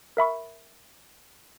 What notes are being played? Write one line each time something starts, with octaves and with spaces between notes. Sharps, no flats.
A#4 E5 B5 C#6